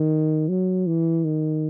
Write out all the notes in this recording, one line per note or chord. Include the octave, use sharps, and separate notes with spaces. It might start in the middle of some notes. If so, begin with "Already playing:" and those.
Already playing: D#3
F#3
E3
D#3